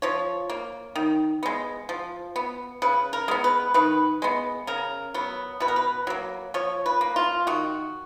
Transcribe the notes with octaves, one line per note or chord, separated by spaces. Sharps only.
F3 C#5
A#3
D#3
G#3 B3
F3
B3
C#3 B4
A#4
G#3 B3
B4
D#3 B4
G#3 B3
C#3 A#4
F#3 B3
B2 B4
A#4
B4
F#3 A#3
F3 C#5
B4
A#3
F4
D#3 F#4